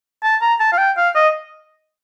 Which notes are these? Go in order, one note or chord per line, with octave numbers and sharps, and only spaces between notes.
A5
A#5
A5
F5
G5
F5
D#5